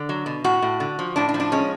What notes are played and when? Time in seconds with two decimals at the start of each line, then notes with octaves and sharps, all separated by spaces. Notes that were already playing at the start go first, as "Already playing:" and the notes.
Already playing: D3
0.09 F#3
0.26 B2
0.44 A2 F#4
0.62 A2
0.80 D3
0.99 F3
1.16 A2 D4
1.29 D4
1.34 F3
1.40 D4
1.52 G#3 C#4